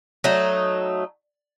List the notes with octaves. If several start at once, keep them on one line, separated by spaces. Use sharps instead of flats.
F#3 A3 D#4